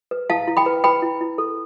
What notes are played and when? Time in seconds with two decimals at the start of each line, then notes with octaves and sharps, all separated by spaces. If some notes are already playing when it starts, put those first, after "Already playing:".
0.11 B4
0.30 E4 F5 A5
0.48 E4
0.57 G5 B5
0.66 B4
0.84 B4 G5 B5
1.02 E4
1.21 E4
1.38 A4